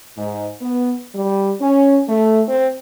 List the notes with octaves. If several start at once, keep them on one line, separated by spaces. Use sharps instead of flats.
G#2
B3
G3
C#4
A3
C4